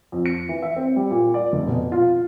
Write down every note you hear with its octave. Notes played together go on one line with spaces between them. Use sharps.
F2
C#7
E3
E5
C4
G3
A#2
D5
F1
B2
F4